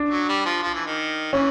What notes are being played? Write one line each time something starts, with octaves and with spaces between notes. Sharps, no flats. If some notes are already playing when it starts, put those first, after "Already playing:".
Already playing: D4
F#3
G3
F3
F3
E3
D#3
E3 C#4